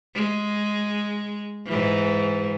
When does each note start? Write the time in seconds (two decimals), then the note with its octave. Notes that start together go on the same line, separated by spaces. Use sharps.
0.15 G#3
1.67 G#2 E3